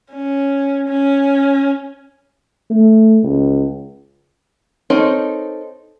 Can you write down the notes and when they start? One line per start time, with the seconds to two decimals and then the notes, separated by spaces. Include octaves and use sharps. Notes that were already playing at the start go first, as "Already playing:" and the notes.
0.12 C#4
0.88 C#4
2.71 A3
3.23 C#2
4.90 C4 D#4 A4 A#4 C#5